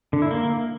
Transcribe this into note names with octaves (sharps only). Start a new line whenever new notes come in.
D3
E4
A#3